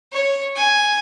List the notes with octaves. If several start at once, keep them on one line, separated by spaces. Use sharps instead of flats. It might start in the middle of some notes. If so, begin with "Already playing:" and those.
C#5
G#5